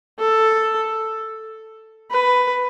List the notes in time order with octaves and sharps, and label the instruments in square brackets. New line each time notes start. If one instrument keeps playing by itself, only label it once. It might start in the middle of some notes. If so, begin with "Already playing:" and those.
[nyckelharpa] A4
B4